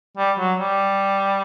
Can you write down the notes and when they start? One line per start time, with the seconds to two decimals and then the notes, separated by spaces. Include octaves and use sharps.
0.17 G3
0.38 F#3
0.59 G3